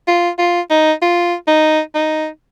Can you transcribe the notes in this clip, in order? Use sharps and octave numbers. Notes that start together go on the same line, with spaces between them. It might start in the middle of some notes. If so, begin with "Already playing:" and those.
F4
F4
D#4
F4
D#4
D#4